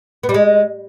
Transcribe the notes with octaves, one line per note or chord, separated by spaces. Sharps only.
B3
G3
G#3